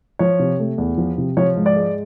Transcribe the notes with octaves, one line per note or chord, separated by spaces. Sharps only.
F3 C#5
C3
A3
E2
F3
C3
F3 C#5
G#2
D5
G#3